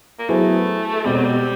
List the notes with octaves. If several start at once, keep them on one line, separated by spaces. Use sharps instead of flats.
A#3
F#3 A3 B3 E4 G#4 C5
B2 G3 G#3 C4
F#3
G3